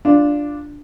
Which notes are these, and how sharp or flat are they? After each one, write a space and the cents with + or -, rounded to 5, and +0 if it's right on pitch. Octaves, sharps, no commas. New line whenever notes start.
D4 +0 F4 +0